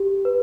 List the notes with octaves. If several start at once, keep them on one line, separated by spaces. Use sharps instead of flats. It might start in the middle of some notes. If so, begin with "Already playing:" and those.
Already playing: G4
B4